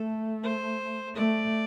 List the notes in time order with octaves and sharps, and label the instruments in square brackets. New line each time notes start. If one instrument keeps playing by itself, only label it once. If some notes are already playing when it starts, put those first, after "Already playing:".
Already playing: [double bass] A3 [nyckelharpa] A4
[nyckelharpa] C5
[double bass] A3 [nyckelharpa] D5